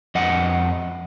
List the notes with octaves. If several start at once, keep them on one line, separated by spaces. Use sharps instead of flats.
F2 D#5 F#5